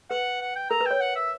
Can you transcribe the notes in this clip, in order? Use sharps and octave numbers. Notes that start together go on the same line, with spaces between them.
B4 F#5
F#5
G5
A#4 A#5
B4
C#5 G5
F#5
E5